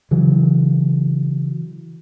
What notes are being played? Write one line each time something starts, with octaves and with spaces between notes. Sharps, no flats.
C#3 E3 F#3